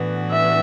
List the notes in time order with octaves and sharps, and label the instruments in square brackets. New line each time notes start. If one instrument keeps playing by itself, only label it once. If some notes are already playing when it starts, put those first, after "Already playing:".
Already playing: [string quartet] A2 E3 B3 D4 F#4
[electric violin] E5